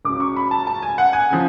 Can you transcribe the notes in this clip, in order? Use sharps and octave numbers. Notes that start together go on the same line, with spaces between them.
C#2 C#3 F#3 D6
C#6
B5
A5
A5
G#5
F#5
G#5
C#3 F3